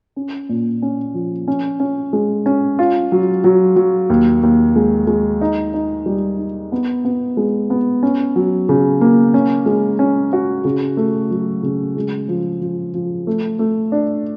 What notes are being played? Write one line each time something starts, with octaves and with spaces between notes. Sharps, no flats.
C#4
A#2
C#4
F3
C#4
C#4
G#3
C#4
F4
F#3
F#3
F#3
D#2
D#2
G#3
G#3
D#4
D#4
G3
D#4
B3
B3
G#3
B3
C#4
F#3
C#3
A#3
C#4
G#3
C#4
F#4
C#3
A3
F#3
C#3
G#3
F3
F3
F3
A3
A3
D4